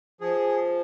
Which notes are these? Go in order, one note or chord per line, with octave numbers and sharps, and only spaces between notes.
F3 G#4